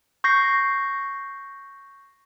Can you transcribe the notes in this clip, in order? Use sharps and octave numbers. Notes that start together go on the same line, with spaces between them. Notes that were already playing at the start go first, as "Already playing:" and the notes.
C#6 G6 A#6 C7